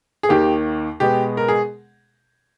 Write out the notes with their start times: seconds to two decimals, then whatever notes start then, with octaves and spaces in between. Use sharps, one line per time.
0.23 G#4
0.29 D#2 D#3 A#3 G4
1.00 B2 G#3 B3 G4
1.37 A#4
1.48 G#4